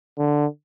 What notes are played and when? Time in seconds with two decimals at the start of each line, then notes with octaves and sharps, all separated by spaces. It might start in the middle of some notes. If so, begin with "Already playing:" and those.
0.18 D3